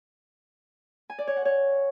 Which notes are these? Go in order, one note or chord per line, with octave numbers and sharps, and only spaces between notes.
G#5
D5
C#5
F#5
C#5